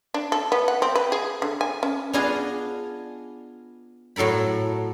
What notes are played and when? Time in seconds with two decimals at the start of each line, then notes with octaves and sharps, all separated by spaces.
0.14 D4
0.32 A4
0.52 B3
0.68 F#5
0.82 C4
0.95 B4
1.12 G#4
1.42 D3
1.61 G#5
1.83 C#4
2.13 B3 D4 F4 G#4 D#5 F5
4.16 A2 F#3 A4 A#4 B5